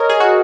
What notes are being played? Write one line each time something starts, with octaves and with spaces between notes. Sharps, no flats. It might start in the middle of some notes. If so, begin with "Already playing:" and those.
Already playing: A#4 C#5 D#5
G#4
F#4